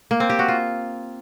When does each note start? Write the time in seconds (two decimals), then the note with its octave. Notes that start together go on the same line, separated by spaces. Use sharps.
0.11 A#3
0.20 C4
0.30 G4
0.39 F#4
0.48 F4